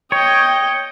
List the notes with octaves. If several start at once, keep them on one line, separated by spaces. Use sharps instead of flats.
C#5 D#5 G5